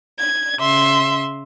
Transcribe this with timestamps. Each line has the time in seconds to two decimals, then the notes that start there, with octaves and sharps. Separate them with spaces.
0.19 G#6
0.60 C#3 E5 C6